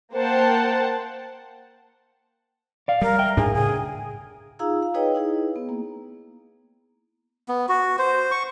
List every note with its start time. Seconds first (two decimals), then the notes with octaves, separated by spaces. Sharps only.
0.13 A#3 C5 F#5 G5 A5
2.88 D5 F5
3.02 G3 A#4
3.19 E5 G5
3.37 D2 G#2 D4 G#4
3.54 A2 C#3 G#4
4.59 D#4 F4 G#4 F5 A#5 E6
4.83 F5
4.94 D#4 G#4 B4 C#5 D#5 G5
5.15 D#4 E4 G#4
5.56 B3
5.69 A#3
7.49 B3
7.69 F#4
7.98 C5
8.31 C#6